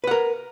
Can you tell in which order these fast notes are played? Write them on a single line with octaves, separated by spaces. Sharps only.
B4 F#5 A#4